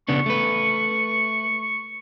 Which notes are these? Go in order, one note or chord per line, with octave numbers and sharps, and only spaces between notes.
C#3 B3 D4 C#6
A3 B4